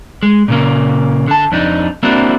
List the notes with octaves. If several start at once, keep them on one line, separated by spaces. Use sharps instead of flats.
G#3
A#2 C#3 A#3
D3 A5
F2 D4 D#4
A#3 C4 D4 E4 F#4